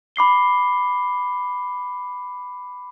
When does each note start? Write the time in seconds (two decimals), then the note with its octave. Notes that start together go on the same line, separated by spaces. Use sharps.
0.16 B5 D6 C7 G7